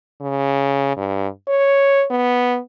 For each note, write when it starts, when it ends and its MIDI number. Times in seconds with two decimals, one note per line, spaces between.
0.21 0.92 49
0.97 1.28 43
1.48 2.05 73
2.11 2.59 59